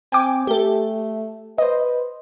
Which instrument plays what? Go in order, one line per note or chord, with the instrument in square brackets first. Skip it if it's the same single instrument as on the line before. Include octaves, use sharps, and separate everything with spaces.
[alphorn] C4 [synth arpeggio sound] G5 G#5 D6
[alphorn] A3 [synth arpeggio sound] G4 A4
[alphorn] B4 [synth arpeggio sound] C5 D#5